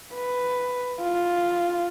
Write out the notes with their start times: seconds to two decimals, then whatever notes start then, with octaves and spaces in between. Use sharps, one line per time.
0.14 B4
1.01 F4